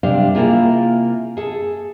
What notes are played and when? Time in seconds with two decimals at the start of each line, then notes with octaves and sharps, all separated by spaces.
0.03 C3 G3 D4 C5 F5
0.35 C3 A#3 E4 F4 G#4
1.37 G#4 A4